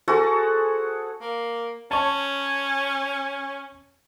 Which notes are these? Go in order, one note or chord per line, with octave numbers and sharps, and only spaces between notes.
F#4 G#4 A4 C5
A#3
C#4 C#5 A5